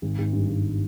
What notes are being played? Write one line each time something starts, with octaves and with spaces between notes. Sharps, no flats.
G#1
G#1
G2
G#1